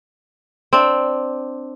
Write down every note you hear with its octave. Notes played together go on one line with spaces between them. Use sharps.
C4 D4